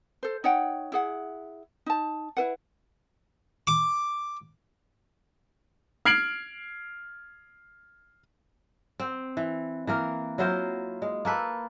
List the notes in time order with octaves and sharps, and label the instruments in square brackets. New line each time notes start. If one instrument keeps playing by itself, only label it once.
[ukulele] A4 C5
D#4 C#5 F#5 G5
E4 G#4 F#5
D#4 A5
E4 B4 F#5
[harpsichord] D6
[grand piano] F6 G#6 C7 D7 F#7
[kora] C4
E3
E3 A#3 A#4
F#3 E4 F4 C5
G#3
A#3 A4 B4